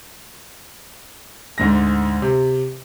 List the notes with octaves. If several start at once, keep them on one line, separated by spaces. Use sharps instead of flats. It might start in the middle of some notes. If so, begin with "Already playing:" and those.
D2 G#2 A#6
C3